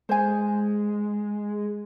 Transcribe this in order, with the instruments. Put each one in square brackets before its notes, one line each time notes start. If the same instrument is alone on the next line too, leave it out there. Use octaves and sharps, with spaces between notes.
[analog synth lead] G#3 [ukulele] C5 G#5